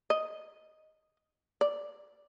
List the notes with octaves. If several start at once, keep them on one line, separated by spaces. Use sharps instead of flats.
D#5
D5